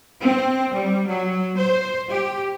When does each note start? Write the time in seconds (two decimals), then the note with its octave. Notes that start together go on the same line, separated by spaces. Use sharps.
0.20 C4
0.73 G3
1.08 F#3
1.58 C5
2.09 G4